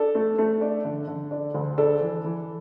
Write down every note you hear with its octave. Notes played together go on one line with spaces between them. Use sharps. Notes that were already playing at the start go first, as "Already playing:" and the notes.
Already playing: D4 A4
A3
A3
D4
D3
D3
D4
D2
D4 A4
E3
E3